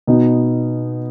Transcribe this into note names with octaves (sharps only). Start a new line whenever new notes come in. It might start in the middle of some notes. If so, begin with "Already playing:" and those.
B2 B3 D#4